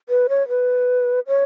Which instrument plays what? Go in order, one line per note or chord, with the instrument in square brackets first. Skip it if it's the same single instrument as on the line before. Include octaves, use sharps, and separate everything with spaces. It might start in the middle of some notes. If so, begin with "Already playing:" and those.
[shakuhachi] B4
C#5
B4
C#5